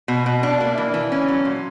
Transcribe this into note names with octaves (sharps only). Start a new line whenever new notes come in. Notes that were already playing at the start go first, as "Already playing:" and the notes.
B2
B2
D4
A#3
E3
E3
C#4
F#3
A#2